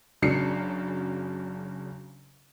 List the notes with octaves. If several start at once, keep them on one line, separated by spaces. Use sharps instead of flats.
F#1 C#3 F#3 D4 C7 C#7